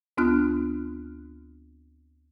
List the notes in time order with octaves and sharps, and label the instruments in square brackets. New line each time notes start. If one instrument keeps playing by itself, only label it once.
[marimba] D2 B3 D4 F4 F6 F#6